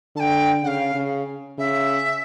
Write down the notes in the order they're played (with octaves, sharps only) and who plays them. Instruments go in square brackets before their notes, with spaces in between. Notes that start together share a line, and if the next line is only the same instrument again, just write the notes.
[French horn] D3 [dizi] A5
[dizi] G5
[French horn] C#3 [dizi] F5 F#5
[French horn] C#3
[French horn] C#3 [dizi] E5